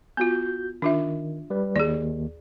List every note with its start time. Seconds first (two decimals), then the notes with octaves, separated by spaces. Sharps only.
0.17 B3 F4 F#4 G6
0.82 D#3 D4 F4 E5
1.50 G3 B4
1.76 D#2 G#4 D5